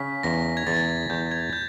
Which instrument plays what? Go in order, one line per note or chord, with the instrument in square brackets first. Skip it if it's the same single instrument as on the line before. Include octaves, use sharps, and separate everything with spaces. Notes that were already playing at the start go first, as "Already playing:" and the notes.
Already playing: [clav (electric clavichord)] C#3 [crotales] B6
[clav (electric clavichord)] E2 [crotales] A#6
[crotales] G#6
[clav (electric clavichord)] E2 [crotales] A6
[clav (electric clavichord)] E2 [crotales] G6
[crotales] G#6
G6